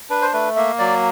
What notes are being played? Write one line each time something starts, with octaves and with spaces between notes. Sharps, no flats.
D4 B4
C5
A3 B4
A#3 E5
F#3 D5